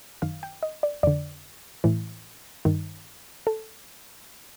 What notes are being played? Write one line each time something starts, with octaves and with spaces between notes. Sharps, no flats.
F#2 D#3 F5
G5
D#5
D5
F2 D3 D5
A2 E3
G2 D#3
A4